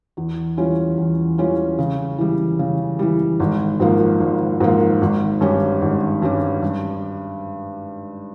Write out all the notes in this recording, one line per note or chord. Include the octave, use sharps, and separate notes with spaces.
E2
E3 G3 C#4 F4
E2
E3 G3 C#4 F4
C#3
E3 G3
C#3
E3 G3
G#1
G#2 F3 A#3
G#1
G#2 F3 A#3
G#1
G2 G3 C#4 G4
G#1
G2 G3 C#4 G4
G2